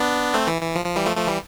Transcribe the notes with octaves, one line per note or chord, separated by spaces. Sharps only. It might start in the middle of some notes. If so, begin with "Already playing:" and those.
Already playing: B3 D4
A3 C4
E3
E3
F3
F3
E3 G3
F3 A3
F3 A3
E3 G3